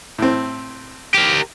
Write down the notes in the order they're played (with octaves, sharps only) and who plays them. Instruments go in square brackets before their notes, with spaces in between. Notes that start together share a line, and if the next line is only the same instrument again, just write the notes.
[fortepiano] A2 C4
[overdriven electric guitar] G4 A#4